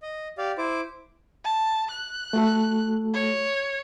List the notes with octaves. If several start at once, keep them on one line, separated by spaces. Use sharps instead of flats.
D#5
G4 D5 F5
E4 C5 D6
A5
F#6
A3 F#4 A4
C#5